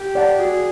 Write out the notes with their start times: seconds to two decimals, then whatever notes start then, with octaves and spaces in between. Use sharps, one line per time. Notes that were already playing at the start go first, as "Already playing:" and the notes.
Already playing: G4
0.15 D5 F#5 A5
0.39 F#4 G#4